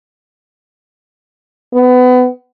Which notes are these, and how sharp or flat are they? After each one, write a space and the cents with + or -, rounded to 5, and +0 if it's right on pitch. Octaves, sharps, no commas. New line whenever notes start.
B3 +25